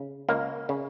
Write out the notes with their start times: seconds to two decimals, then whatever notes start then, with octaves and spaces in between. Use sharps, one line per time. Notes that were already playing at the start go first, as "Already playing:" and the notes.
Already playing: C#3
0.29 C#2 A#3
0.69 C#3